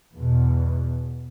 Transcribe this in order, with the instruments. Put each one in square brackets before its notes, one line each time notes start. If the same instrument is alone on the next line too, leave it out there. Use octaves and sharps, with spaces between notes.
[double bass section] E2 B2